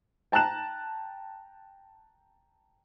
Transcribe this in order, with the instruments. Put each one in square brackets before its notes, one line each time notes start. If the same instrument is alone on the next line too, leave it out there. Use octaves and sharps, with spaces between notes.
[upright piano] G5 A5 A#5 F#6 E7